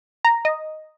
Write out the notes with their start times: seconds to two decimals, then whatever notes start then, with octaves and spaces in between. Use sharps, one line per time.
0.25 A#5
0.45 D#5